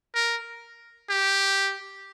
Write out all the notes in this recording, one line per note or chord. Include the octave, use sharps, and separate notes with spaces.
A#4
G4